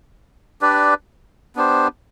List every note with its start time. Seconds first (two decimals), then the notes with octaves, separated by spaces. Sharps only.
0.61 D4 G4 B4 D5
1.56 B3 D4 G4 C5